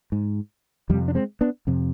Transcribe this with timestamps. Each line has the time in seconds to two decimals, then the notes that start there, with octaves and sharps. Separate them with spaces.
0.12 G#2
0.90 F2 D#3 G3
0.93 C3
1.08 D4
1.15 G#3 C4
1.41 B3 D4
1.67 F2 C3